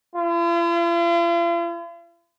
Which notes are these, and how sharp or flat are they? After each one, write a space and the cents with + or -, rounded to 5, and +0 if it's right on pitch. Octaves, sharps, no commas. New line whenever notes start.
F4 -45